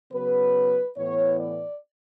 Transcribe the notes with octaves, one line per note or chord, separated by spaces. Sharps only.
C#3 F#3 B3 B4
A2 E3 B3 C#5
D5